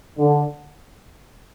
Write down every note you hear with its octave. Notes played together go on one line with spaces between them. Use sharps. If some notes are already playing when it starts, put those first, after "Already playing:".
D3